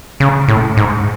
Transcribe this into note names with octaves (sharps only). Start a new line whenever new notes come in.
C#3
A2
G#2